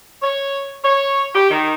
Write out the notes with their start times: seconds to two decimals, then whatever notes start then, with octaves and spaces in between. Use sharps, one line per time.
0.22 C#5
0.83 C#5
1.34 G4
1.51 D#3